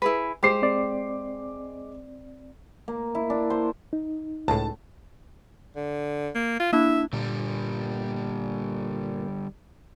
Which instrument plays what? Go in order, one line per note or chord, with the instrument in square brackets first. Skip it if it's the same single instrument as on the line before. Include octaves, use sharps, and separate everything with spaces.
[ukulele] E4 G#4 B4
[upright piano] G#3 D6 C7 [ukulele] G4 C5
[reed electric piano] C4 D5
[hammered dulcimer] A#3
E4
D4
C5
[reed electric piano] D#4
[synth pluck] C#2 A2 [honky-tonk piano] A5
[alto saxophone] D3
A#3
F4
[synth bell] A#3 D4 E4 [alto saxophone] E5
[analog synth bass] A#2 [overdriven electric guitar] D3 G3